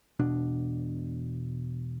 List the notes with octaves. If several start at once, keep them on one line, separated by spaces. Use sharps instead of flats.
E1 B2 D4